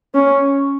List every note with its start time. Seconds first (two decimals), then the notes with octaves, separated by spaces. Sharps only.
0.15 C#4